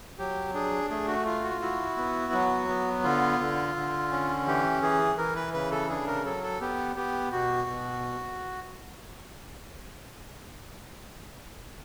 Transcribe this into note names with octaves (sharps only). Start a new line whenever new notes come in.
F#3 G4
D4 G#4
A3 G#4
F#4
F4
F#4
E4 F#4
B3
F#3
B3
D3 F4
D3
D3
C#4
E3 G4
E3 G#4
E3 A#4
B4
C#3 B4
A4
D4 G#4
A#4
F#3 A4
A4
B3 G4
B3 G4
B2 F#4
B2